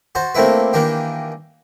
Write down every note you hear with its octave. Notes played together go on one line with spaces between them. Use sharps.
F#4 C5 A5
A3 A#3 C4 D4 E4 B4
D#3 E3 A#3 D4 G4